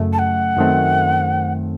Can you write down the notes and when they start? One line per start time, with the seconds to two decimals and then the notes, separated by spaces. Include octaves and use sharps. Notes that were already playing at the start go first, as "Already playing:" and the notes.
Already playing: F#2 C#3 A3
0.13 A5
0.19 F#5
0.57 F#2 D#3 A3 C4